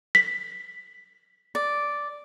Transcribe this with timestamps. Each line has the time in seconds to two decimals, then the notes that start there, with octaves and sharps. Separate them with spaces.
0.15 B6
1.55 D5